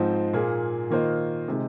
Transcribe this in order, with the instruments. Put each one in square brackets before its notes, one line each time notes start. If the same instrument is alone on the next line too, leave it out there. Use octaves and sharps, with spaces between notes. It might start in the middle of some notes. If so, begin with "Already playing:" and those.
Already playing: [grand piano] G#2 F3 C4 D#4
A#2 A#3 F4 G#4
D#3 A#3 F4 C5 D#5
C3 G#3 D#4